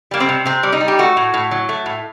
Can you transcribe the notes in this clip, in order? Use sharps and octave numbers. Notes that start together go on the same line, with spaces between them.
G3 A#3
C4
C3
C3 C4
G3
D#4
G3
G4
A3 F#4
A2
A2
F#3
A3
A2